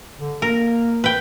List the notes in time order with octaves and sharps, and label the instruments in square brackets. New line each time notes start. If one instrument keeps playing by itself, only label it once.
[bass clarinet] D3
[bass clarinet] A#3 [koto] A#4
[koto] B4 G5